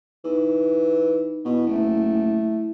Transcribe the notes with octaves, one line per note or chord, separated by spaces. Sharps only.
E3 D#4
B2 E4
F#1 A3